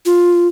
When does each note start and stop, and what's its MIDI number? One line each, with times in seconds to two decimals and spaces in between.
0.06 0.47 65